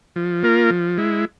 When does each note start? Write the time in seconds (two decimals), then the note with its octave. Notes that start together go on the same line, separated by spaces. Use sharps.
0.16 F3
0.43 A#3 F4 A#4
0.70 F3
0.98 G#3 E4